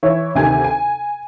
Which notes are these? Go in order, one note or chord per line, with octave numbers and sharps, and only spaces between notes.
E3 C#5 E5
D2 C3 D#3 G#5 G#6
G#5